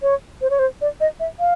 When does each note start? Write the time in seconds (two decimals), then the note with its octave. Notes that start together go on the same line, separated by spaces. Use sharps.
0.02 C#5
0.41 C5
0.50 C#5
0.59 C5
0.81 D5
1.00 D#5
1.20 E5
1.40 F5